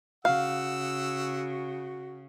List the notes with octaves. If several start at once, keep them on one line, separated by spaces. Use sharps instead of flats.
C#3 F#4 F5 F#5 E6